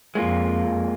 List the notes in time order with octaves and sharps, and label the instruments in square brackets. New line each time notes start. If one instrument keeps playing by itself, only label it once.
[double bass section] F2 [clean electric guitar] G#3 A#3 F4